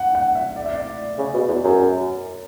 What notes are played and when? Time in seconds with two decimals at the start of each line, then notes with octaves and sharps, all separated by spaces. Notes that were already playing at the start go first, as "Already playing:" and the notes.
Already playing: F#5
0.15 F#5
0.35 E5
0.56 D5
0.66 E5
0.75 D5
1.18 C#3
1.34 B2
1.48 E2
1.64 F#2